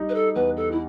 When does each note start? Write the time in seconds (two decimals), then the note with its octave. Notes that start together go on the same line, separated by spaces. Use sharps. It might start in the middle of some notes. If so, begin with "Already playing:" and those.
Already playing: G3 D#4
0.09 B4
0.15 A4
0.35 E2 B4
0.57 A4
0.72 E4